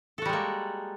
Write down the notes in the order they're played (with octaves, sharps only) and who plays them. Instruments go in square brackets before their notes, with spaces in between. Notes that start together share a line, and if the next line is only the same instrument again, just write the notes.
[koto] A4
F#4
G3
G#3
A#3